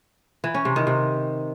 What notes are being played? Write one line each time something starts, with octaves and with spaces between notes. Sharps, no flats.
E3
C#4
C3
D#3
C3